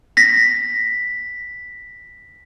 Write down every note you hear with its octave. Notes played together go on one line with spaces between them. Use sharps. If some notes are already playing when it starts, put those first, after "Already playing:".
A#6 B6